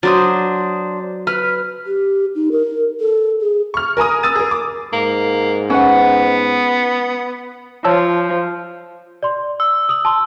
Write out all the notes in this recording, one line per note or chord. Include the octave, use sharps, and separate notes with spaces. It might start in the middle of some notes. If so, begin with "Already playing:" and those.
F#3 D4 C5 D#6
B4 F6
G4
D#4
A#4
A4
G#4
C#6 F6
A#4 G#5 A#5 D#6
D#6 E6 A6 D#7
G#4 A#4
D6
G#2 A#3
B3 C#4 B4 F#5
F3 C#5 A5 E6
D5 C6
E6
D#6 F#7
A5 C6